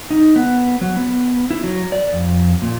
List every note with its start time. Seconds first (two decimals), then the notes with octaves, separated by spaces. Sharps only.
0.11 D#4
0.36 B3
0.81 F#3
0.96 B3
1.51 E4
1.64 F#3
1.92 D5
2.13 F2
2.62 A#2